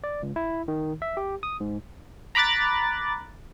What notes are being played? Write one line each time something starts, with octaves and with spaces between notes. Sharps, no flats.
D5
C#2
E4
D#3
E5
G4
D#6
G#2
A#5 B5 D6 F#6 A6